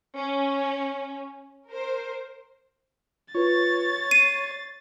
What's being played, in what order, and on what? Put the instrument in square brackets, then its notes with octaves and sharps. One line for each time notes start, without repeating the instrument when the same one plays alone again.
[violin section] C#4
A#4 C5
[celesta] F4 B4 [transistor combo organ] C#5 [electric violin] A6
[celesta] C7 [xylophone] D#7